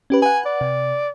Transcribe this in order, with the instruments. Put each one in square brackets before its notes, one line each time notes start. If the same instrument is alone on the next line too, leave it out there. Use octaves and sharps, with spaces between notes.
[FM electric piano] C#4 G4 B4
[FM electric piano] B4 F#5 [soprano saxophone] G#5
[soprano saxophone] D5
[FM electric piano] C3